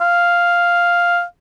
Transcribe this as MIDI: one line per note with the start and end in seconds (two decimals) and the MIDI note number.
0.01 1.23 77